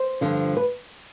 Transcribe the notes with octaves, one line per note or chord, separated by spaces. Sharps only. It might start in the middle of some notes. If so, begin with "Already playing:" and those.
Already playing: C5
G2 D3 F3
B4